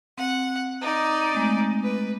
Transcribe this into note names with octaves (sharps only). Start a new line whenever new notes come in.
C4 F#5
D#4 D5
G#3 A3 C4
B4